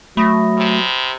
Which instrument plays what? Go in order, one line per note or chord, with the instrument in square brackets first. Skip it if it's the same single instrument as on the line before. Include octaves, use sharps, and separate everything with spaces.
[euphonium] F#3 [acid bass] A3 [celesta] B5 D#6 A#6
[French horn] C3